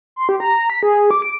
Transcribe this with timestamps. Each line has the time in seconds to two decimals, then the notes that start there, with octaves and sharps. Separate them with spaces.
0.16 C6
0.29 G4
0.40 A#5
0.70 B6
0.83 G#4
1.11 D6
1.22 D7